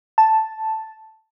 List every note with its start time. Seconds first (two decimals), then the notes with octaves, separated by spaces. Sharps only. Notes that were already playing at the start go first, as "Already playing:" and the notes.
0.18 A5